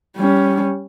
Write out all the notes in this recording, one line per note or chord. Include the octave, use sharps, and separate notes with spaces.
G3 C#4